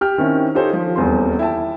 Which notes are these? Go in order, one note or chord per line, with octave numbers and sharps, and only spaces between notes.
G4 G5 F6
D#3 C4 C#4 E4
D#4 F4 G4 A4 C5 C#5
F3
D#1 E2 C4 C6
E4 G5 A5